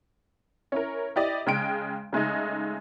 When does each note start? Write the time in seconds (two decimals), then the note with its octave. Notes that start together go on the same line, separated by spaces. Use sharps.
0.72 C#4 E4 A#4
1.16 E4 G4 D5 D#5
1.46 C#3 G#3 G5 D7
2.13 C#3 G#3 A3 D#4